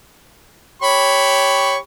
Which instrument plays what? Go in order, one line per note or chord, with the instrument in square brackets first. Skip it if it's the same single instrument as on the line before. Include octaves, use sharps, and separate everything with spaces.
[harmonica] G4 B5 C#6 [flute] C#5